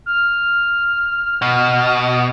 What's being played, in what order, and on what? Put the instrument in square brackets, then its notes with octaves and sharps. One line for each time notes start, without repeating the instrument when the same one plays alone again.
[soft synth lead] F6
[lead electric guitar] B2